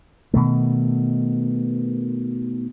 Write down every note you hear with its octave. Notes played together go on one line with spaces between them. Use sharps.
B2 D#3 A3